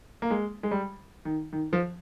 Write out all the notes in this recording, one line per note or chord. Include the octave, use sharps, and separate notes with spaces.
A#3
G#3
G#3
G3
D#3
D#3
F3